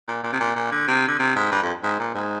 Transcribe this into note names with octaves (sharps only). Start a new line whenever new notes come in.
A#2
A#2
C3
A#2
A#2
D3
C3
D3
C3
G#2
G2
F2
G#2
A#2
G#2